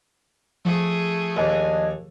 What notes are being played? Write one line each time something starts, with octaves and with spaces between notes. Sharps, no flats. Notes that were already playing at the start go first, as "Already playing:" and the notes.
F3 A3 G#4
D#2 D4 D#5 G#5